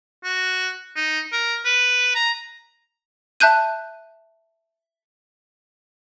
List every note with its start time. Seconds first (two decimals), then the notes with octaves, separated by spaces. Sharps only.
0.24 F#4
0.96 D#4
1.32 A#4
1.65 B4
2.15 A#5
3.40 E5 A5 F#6 G6 D#7